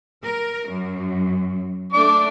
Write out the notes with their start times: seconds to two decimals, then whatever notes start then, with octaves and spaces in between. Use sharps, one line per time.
0.25 A#4
0.69 F#2
1.93 A3 D4 D6